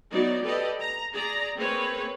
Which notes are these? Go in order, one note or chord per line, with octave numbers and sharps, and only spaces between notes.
F#3 B3 D#4 D5
G4 A4 B4 D5 D#5
A#5
G#4 D5 A#5
A#3 C4 G#4 B4 C#5